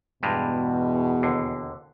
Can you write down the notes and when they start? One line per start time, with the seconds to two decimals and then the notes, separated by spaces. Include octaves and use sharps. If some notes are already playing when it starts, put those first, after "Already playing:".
0.23 E2 G2 B2 G3 G#3
1.23 D#2 D3